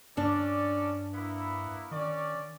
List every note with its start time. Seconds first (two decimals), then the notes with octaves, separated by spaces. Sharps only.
0.17 G2 C#4 D4 A4 D5
1.13 A#3 B3 E4
1.91 D#3 C#4 F#4 D5